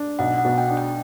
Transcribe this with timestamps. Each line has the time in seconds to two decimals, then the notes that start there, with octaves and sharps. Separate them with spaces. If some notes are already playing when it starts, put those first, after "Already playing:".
Already playing: D4
0.19 B1 F#5
0.38 F#5
0.45 B2
0.58 G5
0.70 D4
0.77 G5